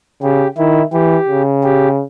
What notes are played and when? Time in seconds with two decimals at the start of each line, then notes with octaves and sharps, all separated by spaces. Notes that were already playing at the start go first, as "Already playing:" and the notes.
0.22 C#3 G4
0.58 D#3 E4
0.92 E3 G4
1.29 C#3
1.64 G4